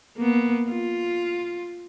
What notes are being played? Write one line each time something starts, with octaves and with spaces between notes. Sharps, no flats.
A#3 B3
F4